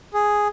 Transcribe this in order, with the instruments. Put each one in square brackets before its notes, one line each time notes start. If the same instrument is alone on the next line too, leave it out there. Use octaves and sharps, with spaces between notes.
[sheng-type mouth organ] G#4